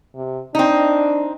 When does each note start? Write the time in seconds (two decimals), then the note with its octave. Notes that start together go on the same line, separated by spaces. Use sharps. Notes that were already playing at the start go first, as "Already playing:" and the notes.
0.15 C3
0.55 C4 D4 D#4